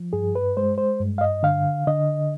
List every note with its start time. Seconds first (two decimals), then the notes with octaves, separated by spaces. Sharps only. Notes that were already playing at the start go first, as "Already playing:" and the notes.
Already playing: F3
0.13 G2 G#4
0.35 B4
0.57 G#3 C5
0.78 C5
1.00 G2
1.18 F5
1.21 D#5
1.43 D3 F5
1.87 D3 D#5